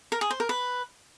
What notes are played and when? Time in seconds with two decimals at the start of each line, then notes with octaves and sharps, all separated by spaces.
0.12 A#4
0.21 G#4
0.31 C5
0.40 A#4
0.49 B4